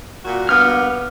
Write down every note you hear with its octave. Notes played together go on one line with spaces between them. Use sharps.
A#2 F#4
G2 A#3 B3 F6